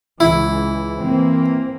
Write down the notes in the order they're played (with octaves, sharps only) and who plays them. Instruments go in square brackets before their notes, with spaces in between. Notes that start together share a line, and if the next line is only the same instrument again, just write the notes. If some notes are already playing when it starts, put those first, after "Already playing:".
[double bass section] C#2 E3 [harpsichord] E4
[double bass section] E3 A#3 C4